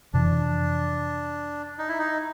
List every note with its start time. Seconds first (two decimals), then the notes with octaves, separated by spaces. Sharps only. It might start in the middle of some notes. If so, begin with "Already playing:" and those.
0.13 F2 C3 E3 D4
1.78 D#4
1.88 E4
1.99 D#4